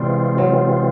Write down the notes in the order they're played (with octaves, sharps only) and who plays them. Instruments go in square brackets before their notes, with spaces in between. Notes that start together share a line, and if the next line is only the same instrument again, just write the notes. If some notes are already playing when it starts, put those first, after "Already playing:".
Already playing: [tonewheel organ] C3 E3 G#3 C4 F4 [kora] G3
[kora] F#3